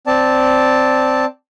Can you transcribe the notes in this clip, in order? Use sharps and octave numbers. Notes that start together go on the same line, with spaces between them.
C4 D5 A5